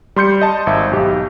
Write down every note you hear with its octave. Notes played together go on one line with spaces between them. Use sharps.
G3 C6 G6 C#7
D#5 A5
G#1 E5
B1 G4